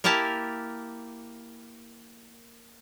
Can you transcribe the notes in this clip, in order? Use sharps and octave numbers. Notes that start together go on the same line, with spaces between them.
A#3 E4 G4 A#4 A5